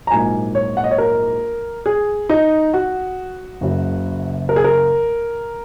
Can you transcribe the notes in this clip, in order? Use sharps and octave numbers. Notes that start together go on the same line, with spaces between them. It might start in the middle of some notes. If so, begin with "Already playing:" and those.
A#5
A#1 G#2 F#3 A#3 G#5
C#5
F#5
D#5
C#5
A#4
G#4
D#4
F#4
F#1 F#2 C#3 F#3
A#4
G#4
A#4